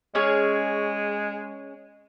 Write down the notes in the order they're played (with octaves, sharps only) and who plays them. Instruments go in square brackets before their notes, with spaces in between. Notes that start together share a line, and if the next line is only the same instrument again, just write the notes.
[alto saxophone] G#3 [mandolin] C#4 G#4 C#5